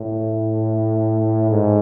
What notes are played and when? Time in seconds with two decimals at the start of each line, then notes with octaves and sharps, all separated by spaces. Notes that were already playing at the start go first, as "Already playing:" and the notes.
Already playing: A2
1.51 G#2